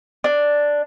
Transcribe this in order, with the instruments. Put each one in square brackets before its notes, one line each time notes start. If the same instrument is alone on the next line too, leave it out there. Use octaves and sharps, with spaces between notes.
[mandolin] D4